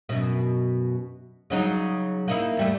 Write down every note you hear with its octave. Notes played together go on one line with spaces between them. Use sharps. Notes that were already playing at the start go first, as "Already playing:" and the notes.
F#2 B2
C#3 F#3 D#4
A#3 D#4 E4
E2 G3 A3